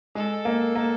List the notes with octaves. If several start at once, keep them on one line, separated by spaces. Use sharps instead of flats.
G#3 A4
A#3
A#3